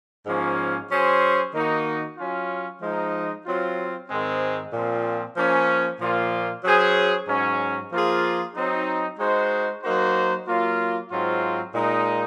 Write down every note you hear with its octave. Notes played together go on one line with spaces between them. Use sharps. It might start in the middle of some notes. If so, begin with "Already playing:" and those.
G#2 F3 A#3 C#4
F#3 C#4 G#4 C5
D#3 A#3 D#4 F#4
F#3 C#4 F4
F3 G#3 D#4
F#3 C4 F4
G#2 D#3 G#3 C4
A#2 F3 C4
F3 A#3 C#4
A#2 F3 A#3 F4
F#3 C#4 G#4 C5
G#2 F#3 C#4
F3 A#3 F4 G#4
F#3 C4 D#4
G#3 D#4 F#4 C5
F#3 A#3 D#4 F#4 C5
F#3 A#3 F4
G#2 F#3 C4 F4
A#2 G#3 D#4